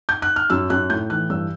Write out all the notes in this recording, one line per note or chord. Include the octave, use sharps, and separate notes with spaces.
G6
F#6
F6
F#2 E6
F#2 F#6
A2 G6
E3 F#6
G2 E6